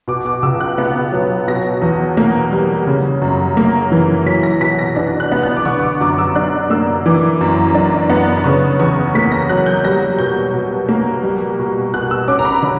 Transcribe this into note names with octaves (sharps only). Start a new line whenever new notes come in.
B2 D6
D6
C#2 E6
F#6
B3
F#3
B2 A#6
E2
A#3
G3
C#3
F#2
A#3
E3
F#3 B6
A#6
B2 B6
A#6
D4 A#6
F#6
B3
F#6
D6
D3 C#6
C#6
D6
F#2 D6
E6
D4 F#6
A#3 E6
E3 D6
F#2
D4
B3
B5
C#3 C#6
E2 C#6
A#3 B6
A#6
F#3 F#6
G6
G3 A#6
B2 G6
B2
A#3
G3
B2
B2 F#6
E6
C#4 D6
A#5
B5
D3